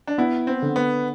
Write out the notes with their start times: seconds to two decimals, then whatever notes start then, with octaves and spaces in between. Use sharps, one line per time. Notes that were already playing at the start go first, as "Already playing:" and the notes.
0.07 D4
0.18 B3 E4
0.47 C4
0.62 D3
0.76 B3